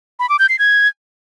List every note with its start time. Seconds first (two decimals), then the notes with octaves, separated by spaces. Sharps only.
0.19 B5
0.29 D6
0.39 G6
0.49 C7
0.59 G#6